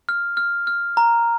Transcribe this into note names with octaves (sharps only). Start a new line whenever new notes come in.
F6
F6
F6
A#5